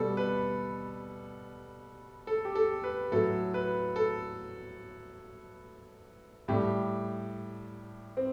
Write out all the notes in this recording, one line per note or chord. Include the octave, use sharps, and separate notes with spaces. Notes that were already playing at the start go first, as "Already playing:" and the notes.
Already playing: B2 G3 A4
B4
A4
G4
A4
B4
A2 F#3 A4
B4
A4
A2 G3 G4
C4